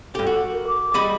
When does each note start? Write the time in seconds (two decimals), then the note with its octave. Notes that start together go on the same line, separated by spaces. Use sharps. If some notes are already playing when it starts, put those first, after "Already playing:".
0.15 G2 G4 A4
0.27 F#4
0.51 A#4
0.67 D6
0.94 G3 G#4 D#5 B5